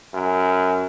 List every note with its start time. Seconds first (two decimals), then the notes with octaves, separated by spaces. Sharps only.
0.14 F#2